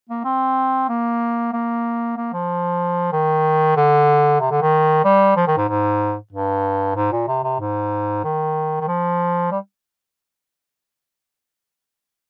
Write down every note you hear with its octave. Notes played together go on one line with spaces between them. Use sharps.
A#3
C4
A#3
A#3
A#3
F3
D#3
D3
C3
D3
D#3
G3
F3
D#3
G#2
G#2
G2
G#2
A#2
C3
C3
G#2
D#3
D#3
F3
G3